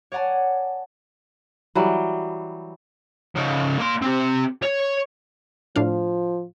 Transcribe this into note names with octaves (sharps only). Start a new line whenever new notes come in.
C#5 D5 F#5 G#5 A5
E3 F#3 G3
C#3 D#4
A#3 C6
C4 G4
C#5
A2 F3 D4 F5